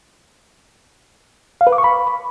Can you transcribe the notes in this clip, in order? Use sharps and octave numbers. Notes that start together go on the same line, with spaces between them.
F5
B4
D6
C#6
B5